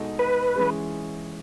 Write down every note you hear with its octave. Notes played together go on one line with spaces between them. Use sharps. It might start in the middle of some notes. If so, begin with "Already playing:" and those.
Already playing: B2 G#3 D#4 F#4 A4
B4
E3 G#3 C#4 G#4